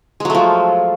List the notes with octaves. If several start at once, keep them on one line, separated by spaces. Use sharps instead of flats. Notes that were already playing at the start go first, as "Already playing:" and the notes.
F3 F#3 G#3 A3